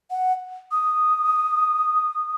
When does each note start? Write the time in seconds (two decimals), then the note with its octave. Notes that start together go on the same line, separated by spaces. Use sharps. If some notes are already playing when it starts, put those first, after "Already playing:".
0.10 F#5
0.72 D#6